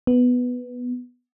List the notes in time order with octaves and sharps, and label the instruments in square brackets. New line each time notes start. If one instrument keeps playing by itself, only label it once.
[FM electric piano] B3